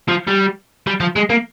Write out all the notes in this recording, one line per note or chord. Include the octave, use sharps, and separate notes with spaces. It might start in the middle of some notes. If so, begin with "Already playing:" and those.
F3
G3
G3
F3
G#3
A#3